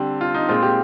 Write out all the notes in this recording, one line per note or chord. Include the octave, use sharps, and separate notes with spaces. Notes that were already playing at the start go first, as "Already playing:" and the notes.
Already playing: D3 G3 C4 G4
F4
D#4
A#2 G#3 C4 F4
G4